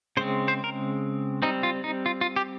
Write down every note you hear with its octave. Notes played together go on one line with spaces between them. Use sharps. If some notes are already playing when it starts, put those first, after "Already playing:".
C#3 G#3 C4 C5
C5
A#4
G3 C4 D#4
F4
D#4
F4
F4
G4